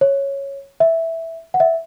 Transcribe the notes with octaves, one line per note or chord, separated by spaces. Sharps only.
C#5
E5
F#5
E5